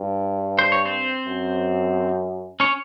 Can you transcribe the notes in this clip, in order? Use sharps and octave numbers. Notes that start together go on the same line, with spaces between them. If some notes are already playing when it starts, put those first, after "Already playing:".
Already playing: G2
C5
C#5
C4 C5
F#2
C#4 C#5